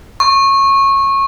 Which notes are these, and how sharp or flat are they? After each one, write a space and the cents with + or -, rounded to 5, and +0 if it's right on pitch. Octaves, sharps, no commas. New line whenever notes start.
C#6 -20